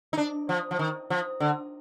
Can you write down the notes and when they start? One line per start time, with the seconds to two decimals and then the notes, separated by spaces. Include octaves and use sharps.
0.13 D#4
0.17 D4
0.49 F3
0.71 F3
0.79 D#3
1.10 F3
1.40 D3